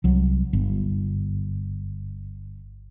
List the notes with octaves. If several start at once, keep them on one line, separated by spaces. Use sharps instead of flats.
C2 F#3
G1